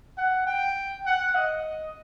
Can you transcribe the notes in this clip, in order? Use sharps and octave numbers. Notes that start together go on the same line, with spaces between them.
F#5
G5
F#5
D#5